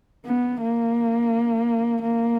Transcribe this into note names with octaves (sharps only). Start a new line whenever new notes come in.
B3
A#3
A#3